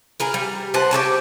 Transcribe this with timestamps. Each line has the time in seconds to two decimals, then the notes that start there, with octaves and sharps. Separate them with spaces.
0.20 G#4 A#4 B4
0.34 G3
0.74 B4 C5 F#5 A5
0.91 G4 A4 C#5 A5